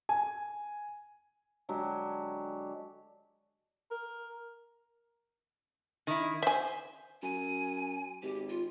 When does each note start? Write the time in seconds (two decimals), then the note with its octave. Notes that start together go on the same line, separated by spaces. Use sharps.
0.09 G#5
1.69 D3 F#3 G#3 G4
3.91 A#4
6.07 D#3 E4
6.42 C5 E5 G#5
7.22 F#2 G#5
8.22 G#1 G4
8.49 F4